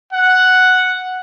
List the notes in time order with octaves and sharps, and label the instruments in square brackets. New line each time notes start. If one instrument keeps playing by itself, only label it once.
[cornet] F#5